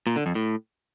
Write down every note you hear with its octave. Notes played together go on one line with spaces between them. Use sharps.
A#2
D3
F2
A2